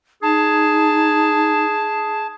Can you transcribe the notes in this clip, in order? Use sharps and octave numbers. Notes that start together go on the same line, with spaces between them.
D#4 G#4 A5